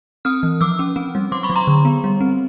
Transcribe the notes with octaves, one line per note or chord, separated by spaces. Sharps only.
C4 D#6 F6
E3
F3 D6 E6
C#4
C4
G3
F#3 C6 D6
B5 C#6
F#3
A#5 C6
D3
B3
G3
C4